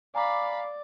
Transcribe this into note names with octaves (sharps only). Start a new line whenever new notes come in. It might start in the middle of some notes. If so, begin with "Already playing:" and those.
D5 F5 G#5 A#5 B5 D6